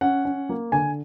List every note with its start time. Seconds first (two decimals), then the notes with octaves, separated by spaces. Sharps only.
0.01 C#4 F#5
0.25 C#4
0.49 A#3
0.72 D3 G#5